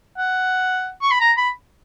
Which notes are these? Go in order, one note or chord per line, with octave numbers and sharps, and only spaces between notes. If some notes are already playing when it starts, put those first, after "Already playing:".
F#5
C#6
B5
A#5
B5